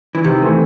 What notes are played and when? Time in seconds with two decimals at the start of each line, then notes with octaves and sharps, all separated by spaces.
0.15 E3
0.24 C3 D#3
0.42 E3 A3 C4